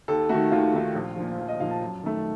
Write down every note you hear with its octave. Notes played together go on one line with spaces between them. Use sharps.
D#2 A4
D#3 A3 F#4
D#2 F4
D#3 A3
A#1
A#2 F3
A#1
D#5
A#2 F3 F5
A5
F#2
D#3 A3